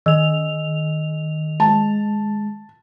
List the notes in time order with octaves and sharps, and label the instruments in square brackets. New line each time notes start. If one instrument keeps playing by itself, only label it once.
[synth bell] D#3 F7 [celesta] D#5 E6
[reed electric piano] G#3 [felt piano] A5